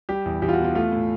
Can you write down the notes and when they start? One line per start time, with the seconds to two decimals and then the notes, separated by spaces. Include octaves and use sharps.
0.09 G3 G4
0.26 E2
0.42 E2 G4
0.49 F4
0.53 F#4
0.59 B2 F4
0.75 A3 F4
0.92 A2